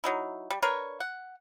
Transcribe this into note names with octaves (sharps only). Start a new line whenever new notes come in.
F#3 D#4 E4
G3
D4 A#4 B4 C#5
F#5